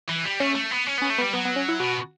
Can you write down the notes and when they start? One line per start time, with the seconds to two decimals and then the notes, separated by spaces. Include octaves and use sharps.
0.09 E3
0.25 G3
0.40 A3 C#4
0.55 A3
0.71 B3
0.87 C#4
0.98 B3 C#4
1.10 A3
1.18 B3
1.21 G3
1.33 F#3 B3
1.45 B3
1.56 C#4
1.68 E4
1.79 B2 F#4